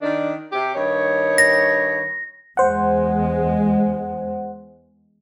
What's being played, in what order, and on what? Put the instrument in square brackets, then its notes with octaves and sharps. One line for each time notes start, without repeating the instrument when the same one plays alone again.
[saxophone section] D#3 D4
C3 G4
G2 D#3 C#5
[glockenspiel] A#6
[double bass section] E2 G#3 [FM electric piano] C5 F#5